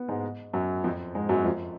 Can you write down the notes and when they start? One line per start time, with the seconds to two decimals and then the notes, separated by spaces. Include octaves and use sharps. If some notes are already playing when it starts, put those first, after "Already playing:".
Already playing: B3
0.09 G#2 G#3
0.53 F#2 F#3
0.84 F2 F3
1.15 G#2 G#3
1.29 F#2 F#3
1.44 F2 F3